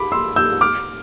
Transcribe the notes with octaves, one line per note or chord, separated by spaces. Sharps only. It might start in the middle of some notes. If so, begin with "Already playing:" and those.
Already playing: B5 D6
C6 E6
E6 G6
D6 F6